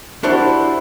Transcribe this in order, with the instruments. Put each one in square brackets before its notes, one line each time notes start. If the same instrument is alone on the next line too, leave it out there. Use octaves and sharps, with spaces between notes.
[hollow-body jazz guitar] D4 E4 F#4 G4 C5 D5